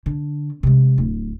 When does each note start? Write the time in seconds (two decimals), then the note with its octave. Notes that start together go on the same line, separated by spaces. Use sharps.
0.06 D3
0.63 C3 G#3
0.98 D1